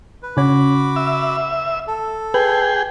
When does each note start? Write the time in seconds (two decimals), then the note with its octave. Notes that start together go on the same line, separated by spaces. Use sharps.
0.23 B4
0.37 C#3 C#4 F#4 B5 D6
0.96 E5
1.87 A4
2.34 G#4 B4 G5